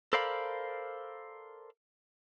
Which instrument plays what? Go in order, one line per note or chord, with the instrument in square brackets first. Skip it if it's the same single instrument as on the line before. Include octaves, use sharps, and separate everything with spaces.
[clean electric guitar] A4 A#4 C5 D5 F5 B5